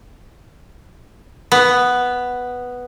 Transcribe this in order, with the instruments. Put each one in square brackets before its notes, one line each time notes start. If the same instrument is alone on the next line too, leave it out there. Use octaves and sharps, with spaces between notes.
[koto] B3